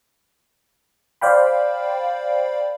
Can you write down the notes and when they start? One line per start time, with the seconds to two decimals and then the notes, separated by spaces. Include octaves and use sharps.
1.21 C5 D5 F5 G5 B5